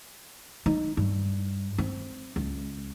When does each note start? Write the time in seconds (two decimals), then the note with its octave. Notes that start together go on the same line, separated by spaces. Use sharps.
0.66 D#4
0.97 G2
1.78 C4
2.36 C#2